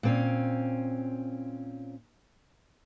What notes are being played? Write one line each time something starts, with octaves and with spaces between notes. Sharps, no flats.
A#2 C4 C#4